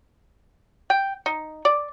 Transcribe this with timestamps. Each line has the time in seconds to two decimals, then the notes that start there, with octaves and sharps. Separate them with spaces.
0.90 G5
1.26 D#4
1.65 D5